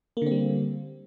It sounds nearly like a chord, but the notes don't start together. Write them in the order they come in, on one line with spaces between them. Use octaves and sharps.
A#3 D3 C4 G3